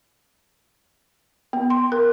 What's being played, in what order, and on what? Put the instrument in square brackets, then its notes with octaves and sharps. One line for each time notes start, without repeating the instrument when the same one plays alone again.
[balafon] B3
C6
A#4